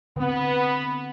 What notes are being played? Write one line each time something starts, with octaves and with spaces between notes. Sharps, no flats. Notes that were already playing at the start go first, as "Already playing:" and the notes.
D3 B3 C4